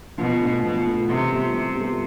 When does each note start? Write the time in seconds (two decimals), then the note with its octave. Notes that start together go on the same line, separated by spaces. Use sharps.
0.18 B2 F3
0.41 A3 D4 F4 A4
0.62 B2 F3
0.85 A3 D4 F4 A4
1.08 C3 E3
1.30 G3 B3 F4 A4
1.53 C3 E3
1.76 G3 B3 F4 A4